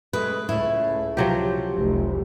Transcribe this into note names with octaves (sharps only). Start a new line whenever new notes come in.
C#3 G#3 A3 B4
C#2 A2 C#4 E4
C3 F3 F#3 C#4 G4
F1 C2